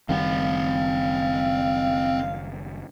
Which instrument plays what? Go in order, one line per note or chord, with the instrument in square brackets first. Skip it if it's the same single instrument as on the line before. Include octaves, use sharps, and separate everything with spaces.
[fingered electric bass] F#1 D#3 G3 [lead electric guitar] C4 F#5 [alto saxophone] F5